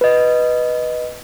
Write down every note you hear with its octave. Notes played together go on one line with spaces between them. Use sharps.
B4 D#5